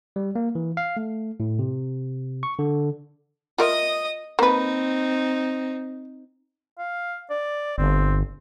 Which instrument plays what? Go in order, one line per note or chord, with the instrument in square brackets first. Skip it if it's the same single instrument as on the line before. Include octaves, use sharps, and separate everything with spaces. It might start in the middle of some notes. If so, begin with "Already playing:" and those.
[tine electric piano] G3
A#3
E3
F5
A3
A2
C3
C#6
D3
[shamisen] F4 A#4 E5 [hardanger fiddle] D#5 D#6
[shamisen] A#3 B4 [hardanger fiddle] C4 D#4
[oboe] F5
D5
[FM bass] G1 [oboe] C4